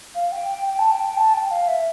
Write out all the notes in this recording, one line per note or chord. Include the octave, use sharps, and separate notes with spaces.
F5
G5
G5
G5
A5
G5
G5
A5
G5
F5
E5